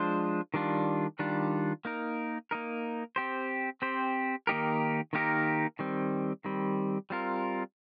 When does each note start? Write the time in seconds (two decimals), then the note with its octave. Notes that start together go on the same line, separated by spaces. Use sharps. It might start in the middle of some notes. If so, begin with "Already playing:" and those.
Already playing: F3 G#3 D4 F4 C5
0.54 D#3 G3 D4 F4
1.19 D#3 G3 D4 F4
1.85 A#3 D#4 A#4
2.51 A#3 D#4 A#4
3.16 C4 G4 C5
3.82 C4 G4 C5
4.47 D#3 A#3 D#4 G4 A#4
5.13 D#3 A#3 D#4 G4 A#4
5.79 D#3 G3 C4
6.45 D#3 G3 C4
7.10 G3 C4 F4 A#4